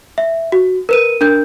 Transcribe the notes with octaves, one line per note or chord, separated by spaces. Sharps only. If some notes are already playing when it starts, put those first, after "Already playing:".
E5
F#4
A#4 B4 D#7
D4 A#4 G6